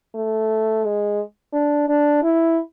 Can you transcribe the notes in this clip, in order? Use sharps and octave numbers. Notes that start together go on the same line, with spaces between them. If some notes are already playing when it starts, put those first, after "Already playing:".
A3
G#3
D4
D4
E4